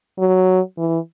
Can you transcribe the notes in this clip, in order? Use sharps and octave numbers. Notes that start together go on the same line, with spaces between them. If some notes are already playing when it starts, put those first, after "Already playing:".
F#3
E3